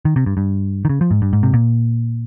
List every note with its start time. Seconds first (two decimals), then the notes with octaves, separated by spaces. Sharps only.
0.05 D#3
0.16 C3
0.26 G2
0.37 G2
0.85 D#3
0.89 C#3
1.01 F3
1.11 G#2
1.22 G2
1.33 G#2
1.43 C3
1.53 A#2